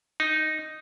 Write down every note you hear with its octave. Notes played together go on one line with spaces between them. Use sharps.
D#4